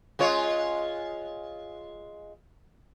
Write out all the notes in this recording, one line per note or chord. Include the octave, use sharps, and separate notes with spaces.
G#3 F4 C#5